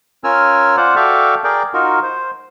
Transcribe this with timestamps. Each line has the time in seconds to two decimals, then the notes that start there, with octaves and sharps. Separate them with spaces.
0.24 C#4 F4 A#4 G#5 E6 F6
0.77 F4 C5 D5 F#5
0.96 F#4 A4 D5 E5 F5 G5
1.44 G#4 A#4 D5 G5
1.74 D#4 F4 F#4 A#4
2.02 C5